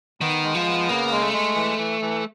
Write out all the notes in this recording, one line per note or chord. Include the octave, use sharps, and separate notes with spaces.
D#3 B3
G#3
F3
B3
C#3 A#3
G#3
A3
G#3
E3
E3
E3